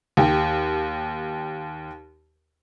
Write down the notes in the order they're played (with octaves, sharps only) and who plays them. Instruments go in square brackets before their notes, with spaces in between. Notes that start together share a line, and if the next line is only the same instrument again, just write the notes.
[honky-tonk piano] D#2 G4